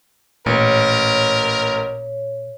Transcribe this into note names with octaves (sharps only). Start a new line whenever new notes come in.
A1 A#2 A#4 C#5